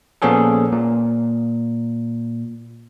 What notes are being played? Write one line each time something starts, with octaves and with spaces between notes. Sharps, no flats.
A#2 F3 B3 C#4 G#4 A4
A#2